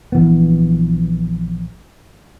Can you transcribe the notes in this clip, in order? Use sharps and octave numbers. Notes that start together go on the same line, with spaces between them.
A#1 E3 B3